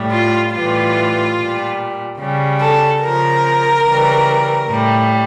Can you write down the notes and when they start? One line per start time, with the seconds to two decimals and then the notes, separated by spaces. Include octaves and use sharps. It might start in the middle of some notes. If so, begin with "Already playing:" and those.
Already playing: A2 G3
0.11 F4
0.52 A2 E3 G3 F4
1.36 A#2 G3
2.18 C#3 G3
2.59 A4
3.01 C#3 F3 A#4
3.84 C#3 E3 G3
4.67 A2 G3